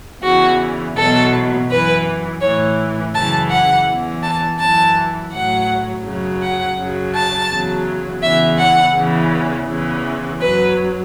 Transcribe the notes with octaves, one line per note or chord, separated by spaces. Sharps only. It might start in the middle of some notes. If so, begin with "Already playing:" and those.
E2 C#3 E3 F#4
E2 B2 F#3 A4
F#2 E3 B4
A2 E3 C#5
F#2 C#3 E3 A5
F#5
E2 E3
A5
F#2 E3 A5
A2 F#3 F#5
F#2 C#3 F#3
F#5
F#2 C#3 F#3
A5
E2 C#3 F#3
E2 C#3 E3 E5
F#5
E2 C#3 E3
E2 C#3 E3
F#2 F#3 B4